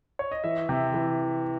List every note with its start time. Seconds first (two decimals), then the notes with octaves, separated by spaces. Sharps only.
0.19 C#5
0.31 D#5
0.44 E3 E5
0.69 C3
0.94 E3